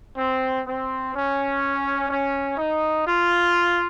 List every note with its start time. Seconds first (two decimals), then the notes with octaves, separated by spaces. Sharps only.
0.17 C4
0.65 C4
1.14 C#4
2.09 C#4
2.58 D#4
3.05 F4